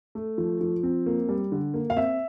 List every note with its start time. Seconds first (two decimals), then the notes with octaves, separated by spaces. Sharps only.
0.15 A3
0.38 F3
0.61 F3
0.83 C4
1.06 A#3
1.29 G3
1.52 D3
1.74 A#3
1.90 F5
1.96 C4 E5